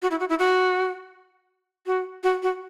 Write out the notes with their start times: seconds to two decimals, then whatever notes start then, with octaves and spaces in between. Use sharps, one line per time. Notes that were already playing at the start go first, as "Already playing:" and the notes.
0.02 F#4
0.11 E4
0.20 F#4
0.29 E4
0.39 F#4
1.87 F#4
2.23 F#4
2.43 F#4